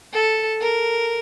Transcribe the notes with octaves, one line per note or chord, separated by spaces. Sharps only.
A4
A#4